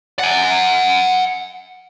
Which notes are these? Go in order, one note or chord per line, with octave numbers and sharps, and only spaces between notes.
F#5 G#5